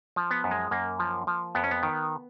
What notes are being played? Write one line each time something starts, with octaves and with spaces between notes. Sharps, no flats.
F3
B3
F#2
G#3
F#2 A#3
F3
F3
F2 B3
C#4
B3
D#3